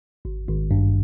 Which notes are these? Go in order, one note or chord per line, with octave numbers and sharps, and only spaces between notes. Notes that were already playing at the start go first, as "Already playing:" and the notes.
G#1
G#1
G2